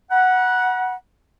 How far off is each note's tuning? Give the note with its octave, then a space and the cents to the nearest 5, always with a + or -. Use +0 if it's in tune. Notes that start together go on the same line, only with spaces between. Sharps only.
F#5 +0 B5 -45